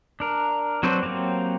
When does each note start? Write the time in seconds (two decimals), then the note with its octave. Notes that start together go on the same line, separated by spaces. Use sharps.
0.20 D4 A#4
0.83 F#3 C4 D4 B4 C5
1.02 F#3 A#3 C4 G4